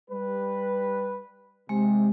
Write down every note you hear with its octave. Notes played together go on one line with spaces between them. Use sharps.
G3 B4
C3 G#3